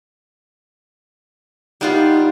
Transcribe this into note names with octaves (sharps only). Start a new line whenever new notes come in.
G3 B3 D#4 F4